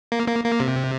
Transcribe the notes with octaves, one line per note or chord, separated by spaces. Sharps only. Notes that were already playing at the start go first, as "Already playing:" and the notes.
A#3
A#3
A#3
C3